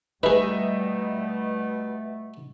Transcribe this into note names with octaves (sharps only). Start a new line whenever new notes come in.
B2 G3 A3 D#4 G#4 B4 D#5 E5